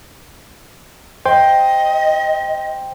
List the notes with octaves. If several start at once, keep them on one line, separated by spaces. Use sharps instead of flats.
C5 D#5 G5 C6